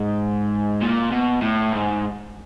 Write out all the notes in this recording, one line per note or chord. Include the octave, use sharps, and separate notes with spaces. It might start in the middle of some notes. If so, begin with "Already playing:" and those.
Already playing: G#2
A#2
B2
A2
G#2